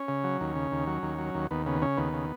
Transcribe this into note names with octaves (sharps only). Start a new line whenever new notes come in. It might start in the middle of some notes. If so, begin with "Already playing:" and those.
Already playing: C#4
C#3
F#3
D#2
C#3
D#2
F#3
D#2
F#3
D#2
D#2 B3
C#3 B3
C#3 C#4
D#2 B3
C#3